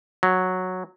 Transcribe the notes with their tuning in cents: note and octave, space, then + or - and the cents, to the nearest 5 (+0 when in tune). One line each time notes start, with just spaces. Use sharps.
F#3 -5